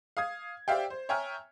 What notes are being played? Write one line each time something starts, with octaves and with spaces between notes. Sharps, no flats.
F5 D#6 G#6
G4 C5 D5 E5 F5 G5
C5
C#5 E5 G5 G#5 A#5 F6